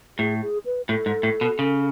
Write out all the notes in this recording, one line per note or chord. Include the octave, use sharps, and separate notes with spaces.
A2 G#4
G#4
B4
A2 A4
G#2
A2
B2
C#3